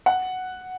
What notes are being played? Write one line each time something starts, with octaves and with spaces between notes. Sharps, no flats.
F#5